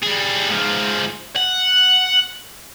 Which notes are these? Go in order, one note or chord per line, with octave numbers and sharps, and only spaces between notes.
G3 G#4
G#2 F3
F#5